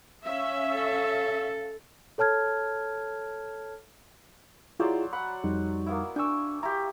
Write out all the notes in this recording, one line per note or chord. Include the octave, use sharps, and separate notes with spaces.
C#4 E5 F5
A4
A4 C#5 A5 F6 G#6
F#3 E4 F4 G#4 C5 D5
F#5 B5
F2 G3 D#4
A#3 B3 E4
D4 G5 G#5 C#6 E6
E4 G4 A#5